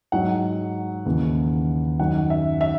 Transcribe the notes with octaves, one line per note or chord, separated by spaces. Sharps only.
G#2 F#3 F#5
D#2 C#3 E3
F#2 D#3 F#3 F#5
E5
E5